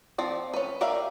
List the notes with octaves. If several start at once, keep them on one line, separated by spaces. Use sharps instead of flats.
F3 C4 D5
C#4 B4
G4 A#4 D5 E5 F5